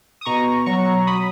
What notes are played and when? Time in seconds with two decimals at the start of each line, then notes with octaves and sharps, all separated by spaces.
0.21 D#6
0.25 B2 A#5 C#6
0.66 F#3 A#5 C#6
1.07 F#3 B5 D#6